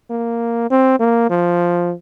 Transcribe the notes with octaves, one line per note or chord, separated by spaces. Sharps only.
A#3
C4
A#3
F3